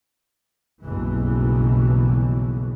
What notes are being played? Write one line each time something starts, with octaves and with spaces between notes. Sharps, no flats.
F#1 B1 G2 B2 E3